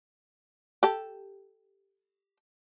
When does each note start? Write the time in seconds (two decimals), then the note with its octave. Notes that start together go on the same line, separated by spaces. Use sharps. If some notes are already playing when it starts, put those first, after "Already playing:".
0.83 G4 A4